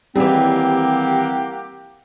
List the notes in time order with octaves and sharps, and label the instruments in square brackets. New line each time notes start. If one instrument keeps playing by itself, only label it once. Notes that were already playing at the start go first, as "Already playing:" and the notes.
[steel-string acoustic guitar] D#2 E3 [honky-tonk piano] G3 G#4 [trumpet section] A#3 G4 F#5 [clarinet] C4